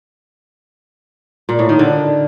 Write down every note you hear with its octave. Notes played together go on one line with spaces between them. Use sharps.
A#2
A2
D#3
D3